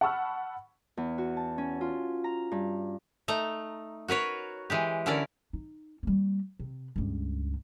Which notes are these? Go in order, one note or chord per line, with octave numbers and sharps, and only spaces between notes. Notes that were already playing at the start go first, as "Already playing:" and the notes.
F#5 A5 B5 C#6 E6 F6
E2
F#4
A5
C#4
F4
A#5
G2
A3 D#4 A#5
F#4 A#4 B4 C#5
E3 G#3 G4
D3 C#4 E4 A#4 D5
D#4
G3 A#3
C3
C#2 G2